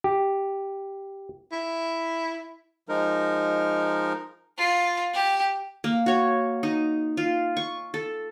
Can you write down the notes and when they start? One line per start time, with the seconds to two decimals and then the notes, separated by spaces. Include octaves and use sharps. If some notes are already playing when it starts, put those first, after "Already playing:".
0.04 G4
1.52 E4
2.89 F3 G#3 D#4 A#4
4.58 F4
5.14 G4
5.84 A#3
6.06 F#4 C#5
6.63 D#4
7.17 F4
7.57 C#6
7.94 A4